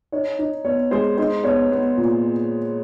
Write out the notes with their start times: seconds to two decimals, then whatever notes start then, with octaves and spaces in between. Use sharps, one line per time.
0.12 D#4 C#5
0.39 D#4
0.65 B3 C#5
0.91 G#3 C5
1.18 D#4 C5
1.44 B3 C#5
1.72 B3
1.97 A#2